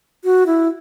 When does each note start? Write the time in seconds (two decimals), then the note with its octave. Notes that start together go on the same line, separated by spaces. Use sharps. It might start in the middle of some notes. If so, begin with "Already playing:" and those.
0.24 F#4
0.47 E4